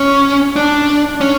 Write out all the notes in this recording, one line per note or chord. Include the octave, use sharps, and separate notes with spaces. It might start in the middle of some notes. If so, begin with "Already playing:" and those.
Already playing: C#4
D4
C#4